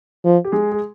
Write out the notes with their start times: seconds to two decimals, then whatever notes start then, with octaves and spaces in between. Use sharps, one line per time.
0.25 F3
0.45 G4
0.52 G#3 G#4
0.72 G#4